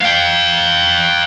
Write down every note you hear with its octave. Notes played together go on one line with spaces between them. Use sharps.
F5 G5